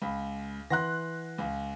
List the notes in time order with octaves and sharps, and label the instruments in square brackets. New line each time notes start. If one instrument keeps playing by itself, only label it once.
[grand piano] C#2 [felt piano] B5
[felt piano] E3 F#5 F#6 [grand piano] C6 A#6
[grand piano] C#2